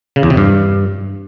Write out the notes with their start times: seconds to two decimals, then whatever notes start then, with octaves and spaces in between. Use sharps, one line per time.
0.16 C#3
0.23 E2
0.30 C3
0.37 G2